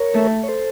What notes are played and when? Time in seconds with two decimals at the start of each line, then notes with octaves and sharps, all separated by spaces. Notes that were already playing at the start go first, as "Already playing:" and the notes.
Already playing: A#4 C#5
0.14 A3
0.43 C#5
0.48 A4 C5